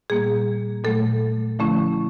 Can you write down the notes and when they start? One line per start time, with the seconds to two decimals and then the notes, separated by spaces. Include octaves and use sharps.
0.10 A#2 G3 A#3 G#4
0.84 A#2 F#3 A3 A4
1.59 D3 F3 A3 C#4 E4